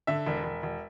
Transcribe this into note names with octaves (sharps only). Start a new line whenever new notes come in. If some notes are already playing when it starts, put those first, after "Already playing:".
D3 E5
E1
E1
E1